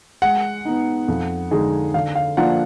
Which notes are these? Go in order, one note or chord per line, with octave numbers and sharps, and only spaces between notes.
G#3 F#5
B3 D#4
F2
D3 G#3 D#4 G#4
D3 F5
F5
F3 A#3 D4 F4 F#5